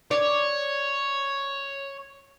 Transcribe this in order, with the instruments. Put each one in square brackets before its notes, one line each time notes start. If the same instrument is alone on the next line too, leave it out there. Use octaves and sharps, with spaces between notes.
[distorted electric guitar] C#5 [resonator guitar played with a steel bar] D5